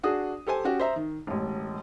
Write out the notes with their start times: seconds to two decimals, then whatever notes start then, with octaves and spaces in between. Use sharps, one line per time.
0.03 D4 F#4 G#4 D#6
0.47 G4 A4 C5 G#5
0.65 C#4 F#4 G4
0.79 C5 E5 A#5
0.96 D#3
1.27 E1 A1